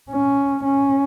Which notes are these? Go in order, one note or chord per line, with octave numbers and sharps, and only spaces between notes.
C#4
C#4